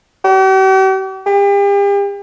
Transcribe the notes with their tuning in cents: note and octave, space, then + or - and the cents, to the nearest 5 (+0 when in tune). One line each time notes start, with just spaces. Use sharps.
G4 -45
G4 +40